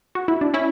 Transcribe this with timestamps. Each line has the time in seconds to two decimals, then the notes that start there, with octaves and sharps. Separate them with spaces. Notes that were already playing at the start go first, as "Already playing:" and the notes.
0.15 F#4
0.28 E4
0.41 D4
0.54 C#4 E4